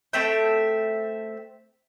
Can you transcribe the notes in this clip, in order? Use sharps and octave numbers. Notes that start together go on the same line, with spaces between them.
A3 C4 E5 G5